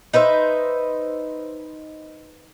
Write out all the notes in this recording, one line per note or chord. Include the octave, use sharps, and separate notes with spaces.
D#4 B4 C5 E5